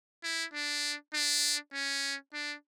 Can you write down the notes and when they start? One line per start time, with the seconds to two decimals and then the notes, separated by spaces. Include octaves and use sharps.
0.24 E4
0.53 D4
1.14 D4
1.73 C#4
2.34 D4